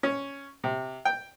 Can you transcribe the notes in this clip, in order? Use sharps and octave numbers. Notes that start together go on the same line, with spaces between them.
C#4
C3
G5